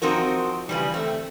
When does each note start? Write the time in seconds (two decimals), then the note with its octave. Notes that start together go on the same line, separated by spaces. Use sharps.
0.02 F3 C4 D#4 F#4 A#4
0.69 C#3 E3 G3
0.94 A3 C4